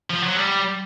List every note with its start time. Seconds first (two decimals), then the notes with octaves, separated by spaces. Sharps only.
0.10 F3
0.23 F#3
0.36 G3